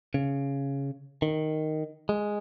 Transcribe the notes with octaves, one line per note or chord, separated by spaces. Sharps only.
C#3
D#3
G#3